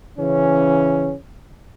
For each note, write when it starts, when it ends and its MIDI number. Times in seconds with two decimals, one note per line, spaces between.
0.18 1.15 49
0.18 1.15 52
0.18 1.15 61